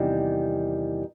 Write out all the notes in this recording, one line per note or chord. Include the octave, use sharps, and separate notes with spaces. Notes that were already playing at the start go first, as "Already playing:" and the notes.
Already playing: E2 C3 D#3 G3